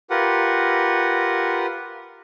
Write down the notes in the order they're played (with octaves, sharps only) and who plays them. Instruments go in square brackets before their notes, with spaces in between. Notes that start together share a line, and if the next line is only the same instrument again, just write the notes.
[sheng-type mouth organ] F4 G4 A#4 B4 F#5